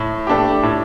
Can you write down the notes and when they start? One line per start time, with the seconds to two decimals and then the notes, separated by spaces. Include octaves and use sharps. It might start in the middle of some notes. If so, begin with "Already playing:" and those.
Already playing: A2
0.27 A3 D4 G4
0.63 A2